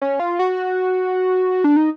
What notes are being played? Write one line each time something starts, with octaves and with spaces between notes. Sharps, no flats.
C#4
F4
F#4
D4
D#4